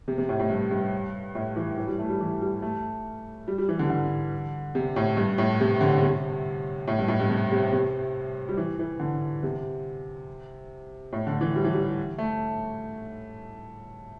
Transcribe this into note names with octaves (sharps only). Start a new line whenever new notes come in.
C3
C3
A2
A2
G2
G2
A2
E3
E3
G3
A3
G3
E3
G3
A3
G3
G3
E3
D3
D3
C3
A2
G2
A2
C3
D3
C3
A2
G2
A2
G2
C3
C3
C3
G3
E3
E3
D3
C3
A2
D3
E3
G3
E3
G3
A3